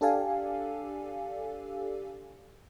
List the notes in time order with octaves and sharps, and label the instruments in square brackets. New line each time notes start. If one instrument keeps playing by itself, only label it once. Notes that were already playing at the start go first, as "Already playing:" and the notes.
[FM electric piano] D4 G4 A4 D5 F5 G#5